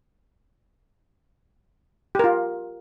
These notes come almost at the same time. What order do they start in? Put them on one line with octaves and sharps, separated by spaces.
G4 A#4 F4